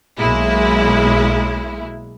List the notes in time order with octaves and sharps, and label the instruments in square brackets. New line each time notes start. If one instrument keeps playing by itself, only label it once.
[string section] B1 G#3 A#3 E4